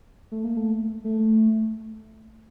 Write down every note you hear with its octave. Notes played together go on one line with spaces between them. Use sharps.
A3
A#3
A3
A3